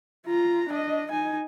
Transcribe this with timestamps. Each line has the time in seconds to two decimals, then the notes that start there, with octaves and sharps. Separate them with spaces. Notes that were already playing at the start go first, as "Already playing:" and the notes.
0.27 F4 A#5
0.69 D4 D#5
1.11 D#4 G#5